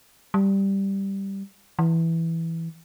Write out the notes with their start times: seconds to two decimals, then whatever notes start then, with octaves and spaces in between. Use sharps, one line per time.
0.34 G3
1.79 E3